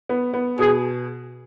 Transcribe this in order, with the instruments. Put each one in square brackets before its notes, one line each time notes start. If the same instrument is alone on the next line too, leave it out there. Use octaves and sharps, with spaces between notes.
[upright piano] B3
B3
[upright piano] B2 [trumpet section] G#4